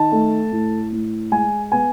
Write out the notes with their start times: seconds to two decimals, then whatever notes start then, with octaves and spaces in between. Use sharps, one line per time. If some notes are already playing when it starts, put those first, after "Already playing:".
Already playing: D#3 A5
0.12 A3
0.52 A2
0.92 A2
1.32 G#3 G#5
1.72 B3 G#5